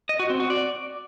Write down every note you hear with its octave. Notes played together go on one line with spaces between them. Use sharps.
D#5
F#4
C4
F#4
D5